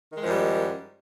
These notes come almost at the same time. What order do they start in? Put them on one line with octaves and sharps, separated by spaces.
D#3 G#3 F3 F#2 G3